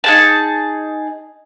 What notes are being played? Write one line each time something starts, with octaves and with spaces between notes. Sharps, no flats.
D#4 G#4 A5